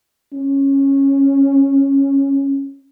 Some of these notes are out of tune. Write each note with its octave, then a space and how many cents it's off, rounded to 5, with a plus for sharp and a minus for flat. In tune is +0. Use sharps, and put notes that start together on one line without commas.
C#4 -10